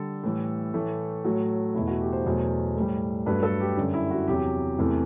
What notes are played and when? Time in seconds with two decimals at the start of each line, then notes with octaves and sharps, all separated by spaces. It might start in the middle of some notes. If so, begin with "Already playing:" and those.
Already playing: D3 G3 A4
0.23 A2 E3 G3
0.74 A2 E3 A3
1.25 A2 F#3 A3
1.75 E2 B2 A3 E4
1.87 F#4
2.01 G4
2.13 C5
2.26 E2 B2 F#3 A3
2.76 A2 G3
3.26 G2 F#3 A3 B4
3.43 A4
3.60 G4
3.77 F#2 D3 G3
3.94 E4
4.11 F#4
4.27 E2 C3 F#3 G4
4.78 E2 C3 E3 A3